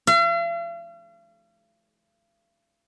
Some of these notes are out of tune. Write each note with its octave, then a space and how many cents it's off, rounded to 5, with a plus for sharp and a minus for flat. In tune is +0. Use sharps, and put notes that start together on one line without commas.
F5 -45